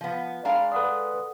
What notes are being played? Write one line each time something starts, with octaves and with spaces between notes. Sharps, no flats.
F3 B3
G#3 D4 F5 A#5 B5
A4 B4 D5 F#5 D#6